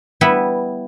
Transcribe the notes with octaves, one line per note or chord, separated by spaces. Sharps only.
G3 B3 E4